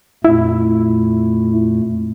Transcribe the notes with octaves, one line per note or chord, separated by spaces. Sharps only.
F2 A#2 A3 E4